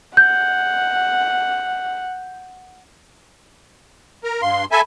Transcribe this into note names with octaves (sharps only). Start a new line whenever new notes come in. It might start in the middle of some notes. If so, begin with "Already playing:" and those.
F#5 G6
A#4
G2 F5 C6
A4 E5 G#5 B5